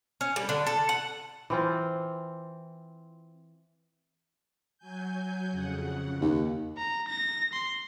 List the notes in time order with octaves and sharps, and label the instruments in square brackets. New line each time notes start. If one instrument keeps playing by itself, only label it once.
[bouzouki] C#4
G3
D3
A4
F#5
[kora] E3 C4 F4
[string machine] F#3 G#5 G6
F2 C#3 F#5
[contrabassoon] D#2
[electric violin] A#5
A#6
C6